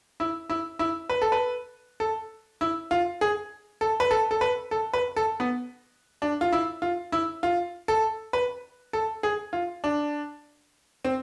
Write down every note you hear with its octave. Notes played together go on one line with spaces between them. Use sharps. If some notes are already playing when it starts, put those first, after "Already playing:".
E4
E4
E4
B4
A4
B4
A4
E4
F4
G#4
A4
B4
A4
A4
B4
A4
B4
A4
B3
D4
F4
E4
F4
E4
F4
A4
B4
A4
G#4
F4
D4
C4